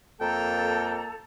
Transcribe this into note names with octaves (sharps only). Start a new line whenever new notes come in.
F2 A#3 A4 G5 A5 A#5